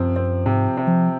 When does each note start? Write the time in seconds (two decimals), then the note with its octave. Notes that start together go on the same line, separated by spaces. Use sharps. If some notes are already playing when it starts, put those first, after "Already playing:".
Already playing: F#2 C3 F3 C4
0.16 C4
0.46 G#2 C3
0.77 C3
0.87 F3